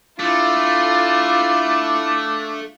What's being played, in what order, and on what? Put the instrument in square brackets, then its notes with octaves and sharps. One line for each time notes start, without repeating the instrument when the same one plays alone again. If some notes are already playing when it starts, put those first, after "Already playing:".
[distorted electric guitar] A3 [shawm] D4 [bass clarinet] E4 [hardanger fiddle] F4